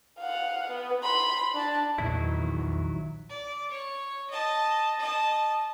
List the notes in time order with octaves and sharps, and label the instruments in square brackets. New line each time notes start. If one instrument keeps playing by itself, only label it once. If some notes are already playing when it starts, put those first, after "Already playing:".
[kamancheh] F5 F#5
B3
B5 C6
D4 A5
[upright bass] A#1 [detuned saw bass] E2 [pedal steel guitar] D#3 F#3 E4
[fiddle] D5
C#5
D#5 A5
D#5 A5